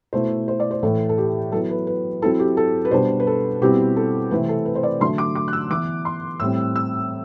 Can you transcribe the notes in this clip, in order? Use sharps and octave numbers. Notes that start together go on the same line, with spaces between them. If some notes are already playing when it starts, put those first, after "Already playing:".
B2 A3 E4 C5
C5
D5
C5
A2 E3 A3 A4
A4
G4
F#3 B3 E4 A4
B4
B4
F#3 C4 E4 A4
G4
A4
B4
B2 G3 D4 C5
B4
A4
B2 G3 C4 E4 G4
A4
C3 E3 A3 C4 E4 B4
A4
B4
C5
D5
D3 F#3 A3 C6
D6
D6
F#6
E6
E3 B3 E4 D6
C6
A2 G3 C4 E6
E6